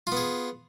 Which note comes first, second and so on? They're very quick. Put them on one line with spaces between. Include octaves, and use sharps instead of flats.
F4 B3 G#4